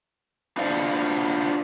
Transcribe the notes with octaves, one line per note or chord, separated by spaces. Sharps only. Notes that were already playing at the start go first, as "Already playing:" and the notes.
D4 F4 C5 D5 F5 F#5